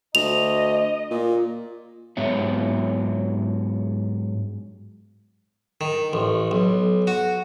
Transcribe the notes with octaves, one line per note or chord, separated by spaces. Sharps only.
D2 D#5 F7
A#2
G#2 F#3 B3 C#5 E5
D#3
A1
B1
F#4